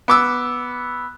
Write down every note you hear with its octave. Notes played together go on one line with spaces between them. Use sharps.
B3 D6 E6